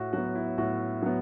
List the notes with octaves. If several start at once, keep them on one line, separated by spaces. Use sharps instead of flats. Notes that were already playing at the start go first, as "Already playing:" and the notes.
Already playing: A2 F#4
F#3 B3 F#4
E4
A2 F#4
F#3 B3